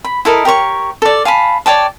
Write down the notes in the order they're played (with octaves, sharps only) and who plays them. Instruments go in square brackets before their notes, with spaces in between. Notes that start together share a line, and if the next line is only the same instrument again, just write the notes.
[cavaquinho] B5
E4 A4 A#4 D#5
G4 A#4 C#5 C#6
A4 D5
F5 G#5 A5 B5
C#5 D5 G5 A5